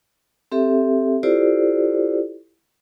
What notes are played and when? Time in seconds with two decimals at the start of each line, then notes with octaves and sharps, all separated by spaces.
0.52 C4 G4 A4 E5
1.23 E4 F4 G4 A4 C5 D5